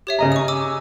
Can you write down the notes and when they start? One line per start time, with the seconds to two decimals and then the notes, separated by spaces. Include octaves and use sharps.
0.07 G4 C#5 E5
0.19 C#3 D#5 A#5
0.32 C#6 D#6
0.48 G#5 D6 E6